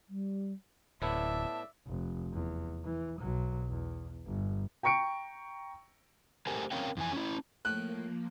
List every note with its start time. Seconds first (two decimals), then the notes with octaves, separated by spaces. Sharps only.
0.09 G3
1.02 D1 A2 B3 E4 D5 E5 A5
1.87 F1
2.33 E2
2.85 E3
3.19 B1 F#3
3.69 E2
4.27 G1
4.83 G5 A#5 C#6 C#7 D7
6.47 A3 G4 A#4 C5 G#5
6.72 C4 C#4 A#4 C#5 F5 G5
6.97 F2 E3 G#5
7.13 C#4 E4
7.65 A2 F3 A3 A#3 F#6